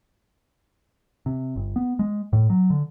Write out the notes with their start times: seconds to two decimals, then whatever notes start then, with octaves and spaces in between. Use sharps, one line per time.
1.26 C3
1.56 G1
1.76 B3
1.99 G#3
2.33 A2
2.50 F#3
2.70 D3